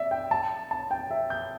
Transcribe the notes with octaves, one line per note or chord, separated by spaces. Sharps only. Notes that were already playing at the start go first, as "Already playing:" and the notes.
Already playing: D5 E5
G5
A5
A5
G5
E5
G6